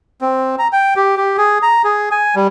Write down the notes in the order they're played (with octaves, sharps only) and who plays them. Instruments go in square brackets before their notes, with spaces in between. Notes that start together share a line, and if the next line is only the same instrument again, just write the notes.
[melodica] C4
A#5
G5
G4
G4
G#4
A#5
G#4
G#5
G3